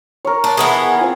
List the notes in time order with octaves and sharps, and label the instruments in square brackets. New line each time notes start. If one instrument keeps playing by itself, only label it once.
[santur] A#4 C#5
[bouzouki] D4
E3 B3 G#4
[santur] C4 F4 G#5